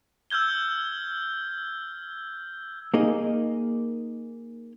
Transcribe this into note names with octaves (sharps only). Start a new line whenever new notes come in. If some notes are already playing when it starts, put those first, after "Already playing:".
E6 F6 G6 G#6 G7
A#3 D#4 G#4 D#5